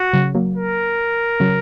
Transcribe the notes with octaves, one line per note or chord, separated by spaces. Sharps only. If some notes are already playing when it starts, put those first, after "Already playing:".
Already playing: F#4
C#3 F#3
F#3 A#3
A#4
C#3 F#3